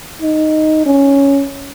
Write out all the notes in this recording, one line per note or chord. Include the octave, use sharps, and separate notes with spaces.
D#4
C#4